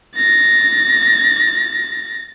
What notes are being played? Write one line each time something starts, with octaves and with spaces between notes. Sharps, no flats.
A6 A#6